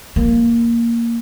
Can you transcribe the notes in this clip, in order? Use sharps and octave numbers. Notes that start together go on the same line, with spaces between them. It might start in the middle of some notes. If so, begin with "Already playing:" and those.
A#3